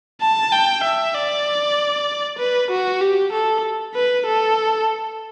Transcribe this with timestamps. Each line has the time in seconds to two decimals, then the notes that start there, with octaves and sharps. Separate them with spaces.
0.21 A5
0.52 G5
0.84 E5
1.15 D5
2.38 B4
2.71 F#4
3.01 G4
3.33 A4
3.95 B4
4.26 A4